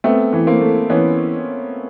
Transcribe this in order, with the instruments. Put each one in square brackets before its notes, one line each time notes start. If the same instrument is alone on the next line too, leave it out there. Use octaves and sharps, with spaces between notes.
[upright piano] A3 B3 [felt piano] C4
[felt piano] E3
[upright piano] A#3 C4
[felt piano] A3
[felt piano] E3 [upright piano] B3 C#4